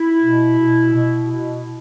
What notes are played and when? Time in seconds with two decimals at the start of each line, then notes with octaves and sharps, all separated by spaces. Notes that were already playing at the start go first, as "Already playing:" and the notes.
Already playing: E4
0.22 B2
0.58 B2
0.94 B2
1.31 B2